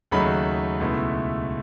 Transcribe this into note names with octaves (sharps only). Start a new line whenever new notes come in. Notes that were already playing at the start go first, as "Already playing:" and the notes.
D#2 C#3 F#3 A3 D#4 B5
C#2 B2 A3 E4